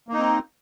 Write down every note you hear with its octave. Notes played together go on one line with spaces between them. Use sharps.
A#3 C4 D#4